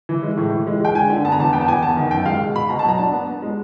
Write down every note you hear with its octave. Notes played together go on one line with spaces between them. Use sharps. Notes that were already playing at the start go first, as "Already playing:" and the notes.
E3
G#3
A2
E3
G#3
G#3 G5
D3 G#5
D3
B3 A5
A#5
E2 A5
B3 G5
A5
E2 G#5
B3 A5
D#3
F#2 G5
G#3 F5
B2
B2 B5
B2 A#5
A5
F#3 A#5
D4 A5
B3
B3
G#3